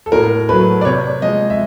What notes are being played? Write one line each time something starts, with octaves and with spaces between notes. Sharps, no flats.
A4
A2 A#4
F#3 A3 B4
D5
C3 C#5
F3 G#3 D#5
E5